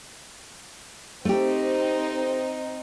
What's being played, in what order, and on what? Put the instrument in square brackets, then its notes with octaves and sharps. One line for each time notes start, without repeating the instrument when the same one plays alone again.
[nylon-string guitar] A3 G4 [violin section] C4 D#4